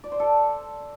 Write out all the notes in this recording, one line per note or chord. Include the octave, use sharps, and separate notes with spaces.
D5
C5
A4